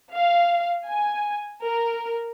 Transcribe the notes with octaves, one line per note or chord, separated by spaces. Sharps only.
F5
G#5
A#4